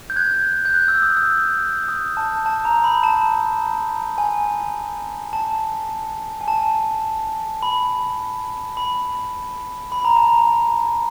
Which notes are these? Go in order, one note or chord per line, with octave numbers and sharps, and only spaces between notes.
G6
F#6 G#6
G6
F#6
E6
D#6
E6
D#6
A5
A5
A#5
B5
A5
G#5
A5
G#5
A5
B5
B5
B5
A#5
A5
A#5